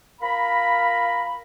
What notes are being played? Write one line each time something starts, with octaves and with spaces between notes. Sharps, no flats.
F4 A#4 F5 A#5 B5